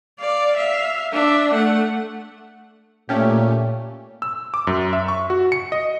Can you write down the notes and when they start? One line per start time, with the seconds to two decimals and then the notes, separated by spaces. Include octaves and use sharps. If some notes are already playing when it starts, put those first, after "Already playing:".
0.20 D5 F5
0.57 E5 F5
1.13 D4 E5
1.54 A3 F#5
3.09 A#2 A3 C#4 G4
4.22 E6
4.54 D6
4.67 F#2
4.93 E5
5.08 C#6
5.30 F#4
5.52 C#7
5.72 D#5